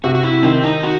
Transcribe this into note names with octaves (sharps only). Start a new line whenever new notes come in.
C3 F#4
F#4
E4
D#3 C4
D#4
F#4